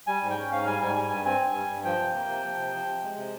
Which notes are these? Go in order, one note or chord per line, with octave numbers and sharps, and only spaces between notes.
G3 G#5
G#2
G5
C#4
G#2 F5
G3 G#5
G#2 G#5
G3 G#5
G2 G#5
C4 G#5
G2
G3
G2
F3 G5
C3
A#3
C3
F3
C3
F3
C3
G#3
C3